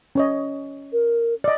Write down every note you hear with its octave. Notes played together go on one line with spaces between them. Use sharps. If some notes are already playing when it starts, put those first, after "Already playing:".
C#4 C#5 D#5
A#4
D5 D#5